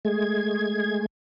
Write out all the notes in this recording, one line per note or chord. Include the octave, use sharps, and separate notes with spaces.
G#3 A3 G#4 G#6